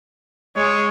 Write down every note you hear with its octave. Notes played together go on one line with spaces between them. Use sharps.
G#3 C#5